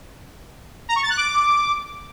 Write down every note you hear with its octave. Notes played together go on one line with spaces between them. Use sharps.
A#5
C#6
A6
F#6
D6